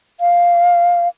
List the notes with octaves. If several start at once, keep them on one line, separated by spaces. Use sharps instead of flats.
F5